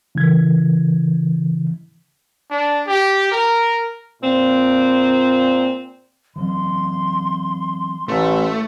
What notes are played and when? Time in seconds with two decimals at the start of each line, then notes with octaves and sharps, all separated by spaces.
0.15 C#3 E3 G#6
2.50 D4
2.87 G4
3.32 A#4
4.23 A#2 C4
6.36 E3 F#3 C4 C6
8.08 A1 A3